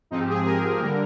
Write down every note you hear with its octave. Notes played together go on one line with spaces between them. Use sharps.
G#2 F3 C4 D#4
G4
G#4
A#4
D3 G3 A#3